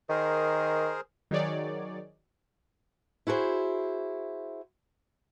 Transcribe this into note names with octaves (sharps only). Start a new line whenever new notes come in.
D#3 G#4 A#4 C5
D#3 F#3 D#4 G#4 C#5 D5
E4 F#4 G#4 A#4 C5